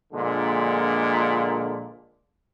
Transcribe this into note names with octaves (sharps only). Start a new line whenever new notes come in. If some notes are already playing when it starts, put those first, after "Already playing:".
A#1 A#2 D3 G#3